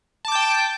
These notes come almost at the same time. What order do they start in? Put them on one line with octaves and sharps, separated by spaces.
A5 D6 G6 G5